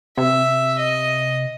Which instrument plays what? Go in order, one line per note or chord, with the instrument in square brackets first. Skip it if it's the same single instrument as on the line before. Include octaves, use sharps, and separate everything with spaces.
[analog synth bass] C3 [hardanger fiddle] E5
[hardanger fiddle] D#5